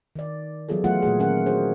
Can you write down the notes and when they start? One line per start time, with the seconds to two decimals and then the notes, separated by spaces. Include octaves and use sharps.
0.16 D#3 D5
0.69 E3 F#3 B3 F4 G#4 A4
0.84 F#3 A3 B3 F4 G#4 F#5
1.02 A#2 A3 G#4
1.19 D#3 B3 C#4 G#4 A#4 F#5
1.46 D4 F#4 G#4 A#4 C5